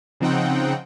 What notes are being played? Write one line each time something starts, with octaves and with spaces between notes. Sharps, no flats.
C#3 F3 C4 D#4 F#5 G5